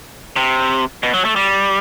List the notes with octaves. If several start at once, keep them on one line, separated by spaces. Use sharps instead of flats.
C3
B2
F#3
A3
G3